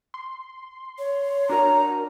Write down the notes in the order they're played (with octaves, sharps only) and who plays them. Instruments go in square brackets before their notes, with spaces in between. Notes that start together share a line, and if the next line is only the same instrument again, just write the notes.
[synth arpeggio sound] C6
[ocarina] C#5
[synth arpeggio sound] D4 F#4 A#4 [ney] A#5